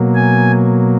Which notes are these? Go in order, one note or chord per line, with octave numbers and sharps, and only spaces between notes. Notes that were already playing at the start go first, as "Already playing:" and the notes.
Already playing: B2 F#3 A#3
G#5